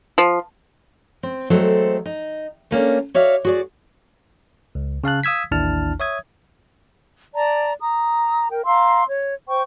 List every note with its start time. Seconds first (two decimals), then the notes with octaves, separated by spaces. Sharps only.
0.18 F3
1.23 C4
1.50 F#3 G#3 A3 C4 A4 C5
2.06 D#4
2.71 A3 A#3 C#4 D4
3.15 F#4 C#5 D5 E5 F5
3.45 F#4 G#4 D5
4.75 C#2
5.04 C#3 F5 A5 F#6
5.24 F5 D#6 E6 G#6 B6
5.51 A1 D#2 D4 E4 A5 F6
6.00 C#5 E5 D#6 G#6
7.35 D5 A5 A#5
7.81 A#5 D#6
8.51 A#4 G5
8.65 F5 A#5 C6 E6
9.07 C#5
9.48 C5 G5 C#6